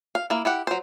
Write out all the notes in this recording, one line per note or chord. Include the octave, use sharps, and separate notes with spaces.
F5
A#3 E4
E4 G4 F#5
F#3 C5